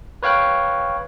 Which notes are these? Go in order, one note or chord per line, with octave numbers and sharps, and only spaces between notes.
B4 C#5 F5 G5 F#6